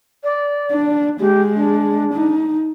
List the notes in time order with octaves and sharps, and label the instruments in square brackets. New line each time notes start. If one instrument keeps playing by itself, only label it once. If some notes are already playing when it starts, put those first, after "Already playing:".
[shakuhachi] D5
[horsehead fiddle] D4
[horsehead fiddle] G#3 [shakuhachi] G4
[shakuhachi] D4
[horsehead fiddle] D#4